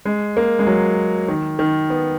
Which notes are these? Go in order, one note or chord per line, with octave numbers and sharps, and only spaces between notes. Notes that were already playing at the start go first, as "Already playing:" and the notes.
G#3
A#3
G#3
F#3
D#3
D#3
B3